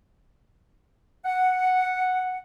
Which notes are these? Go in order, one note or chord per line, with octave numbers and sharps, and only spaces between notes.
F#5